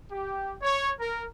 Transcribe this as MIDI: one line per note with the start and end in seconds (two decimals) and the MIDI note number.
0.10 0.52 67
0.61 0.90 73
1.00 1.24 70